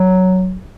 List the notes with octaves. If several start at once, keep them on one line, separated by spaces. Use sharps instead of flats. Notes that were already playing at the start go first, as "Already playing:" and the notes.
Already playing: F#3